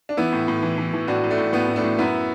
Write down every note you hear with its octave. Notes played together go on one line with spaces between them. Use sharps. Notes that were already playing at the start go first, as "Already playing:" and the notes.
D4
E3 B3 E4
A2
A2
E3
E3
E3
A2 D4 F#4
A2
A3 D4
A2
A2 B3
A2
A3 D4
A2
F#2 B3 E4